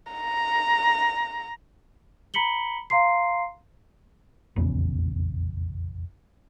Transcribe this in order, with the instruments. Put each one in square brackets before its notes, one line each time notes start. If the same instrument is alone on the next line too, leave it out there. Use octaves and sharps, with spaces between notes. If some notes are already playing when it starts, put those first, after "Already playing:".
[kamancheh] A#5
[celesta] A#5 B5 B6 C#7 F#7 G7
F5 A#5 C6 C7
[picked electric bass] F1 A#1 E2 C#3